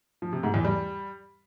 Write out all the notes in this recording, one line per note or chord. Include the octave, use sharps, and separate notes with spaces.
F3
C3
G#2
E2
G3